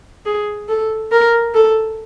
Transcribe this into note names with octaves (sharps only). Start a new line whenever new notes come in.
G#4
A4
A#4
A4